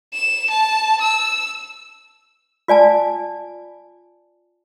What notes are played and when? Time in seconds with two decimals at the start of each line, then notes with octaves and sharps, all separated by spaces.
0.14 E7
0.50 A5
1.01 E6
2.68 F4 D5 G#5 A5